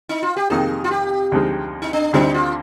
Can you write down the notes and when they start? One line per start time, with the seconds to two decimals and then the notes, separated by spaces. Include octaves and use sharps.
0.09 D#4
0.23 F4
0.37 G4
0.50 F2 C3 D#3 A#3 D#4 G#4
0.84 F4
0.91 G4
1.32 D2 C3 F3 G#3 D#4
1.82 D#4
1.93 D4
2.13 D2 D3 G3 C4 D#4
2.34 F4